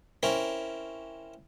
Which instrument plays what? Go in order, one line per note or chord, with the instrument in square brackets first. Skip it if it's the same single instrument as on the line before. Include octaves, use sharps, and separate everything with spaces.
[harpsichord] C4 C#4 E4 A#4